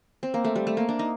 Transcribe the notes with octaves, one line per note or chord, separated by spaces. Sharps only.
C4
A#3
A3
G3
A3
A#3
D4
D#4